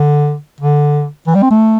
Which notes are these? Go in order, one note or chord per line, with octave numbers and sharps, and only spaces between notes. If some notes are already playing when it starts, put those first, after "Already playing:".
Already playing: D3
D3
E3
G3
C4
A3